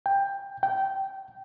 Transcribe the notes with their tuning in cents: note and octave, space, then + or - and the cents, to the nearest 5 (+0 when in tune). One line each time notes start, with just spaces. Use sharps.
G5 +15
G5 -15